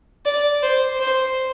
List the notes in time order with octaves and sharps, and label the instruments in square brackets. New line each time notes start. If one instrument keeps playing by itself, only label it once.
[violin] D5
C5
C5